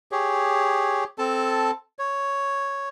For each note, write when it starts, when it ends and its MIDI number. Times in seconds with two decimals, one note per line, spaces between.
0.12 1.04 67
0.12 1.04 68
0.12 1.04 73
1.18 1.71 60
1.18 1.71 69
1.18 1.71 81
1.99 2.89 73